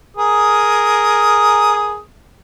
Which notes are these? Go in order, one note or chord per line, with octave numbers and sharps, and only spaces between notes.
G#4 A#4 D#6